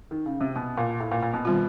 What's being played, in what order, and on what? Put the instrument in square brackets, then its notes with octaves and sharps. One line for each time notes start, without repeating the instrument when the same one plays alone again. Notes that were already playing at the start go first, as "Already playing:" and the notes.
[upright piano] D#3
C#3
C3
B2
A#2
A2
A#2
A#2
B2
[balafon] D#3 G3 C4 F4